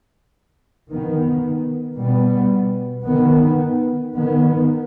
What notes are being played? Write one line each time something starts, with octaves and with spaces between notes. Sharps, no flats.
D#3 B3
B2 G3 B3
D#3 B3
D#3 B3